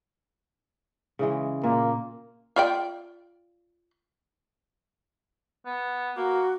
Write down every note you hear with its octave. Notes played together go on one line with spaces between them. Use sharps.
C#3 E3 G#3
A#2 A#3
F4 D5 G5
B3
A#3 F#4